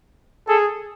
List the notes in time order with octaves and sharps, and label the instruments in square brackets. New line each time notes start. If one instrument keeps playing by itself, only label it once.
[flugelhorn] G#4 [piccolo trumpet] A4